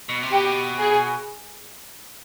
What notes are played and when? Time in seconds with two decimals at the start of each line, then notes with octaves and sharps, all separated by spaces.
0.09 B2
0.23 C3
0.32 B2 G4
0.78 G#4